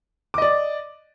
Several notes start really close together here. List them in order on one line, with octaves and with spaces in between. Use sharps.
D6 D#5 D5